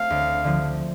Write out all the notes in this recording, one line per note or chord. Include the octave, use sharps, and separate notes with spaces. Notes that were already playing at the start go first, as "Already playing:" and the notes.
Already playing: A3 C4 F5
D2
D3 F3